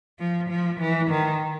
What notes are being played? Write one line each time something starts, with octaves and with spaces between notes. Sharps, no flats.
F3
F3
E3
D#3